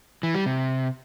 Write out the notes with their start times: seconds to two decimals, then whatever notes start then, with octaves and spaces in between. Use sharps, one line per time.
0.23 E3
0.35 G3
0.46 C3